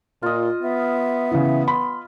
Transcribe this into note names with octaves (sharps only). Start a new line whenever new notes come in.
A#2 F4 D#5
B3 E5
C#3 E3
B5 C6